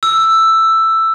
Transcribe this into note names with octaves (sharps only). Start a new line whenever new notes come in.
E6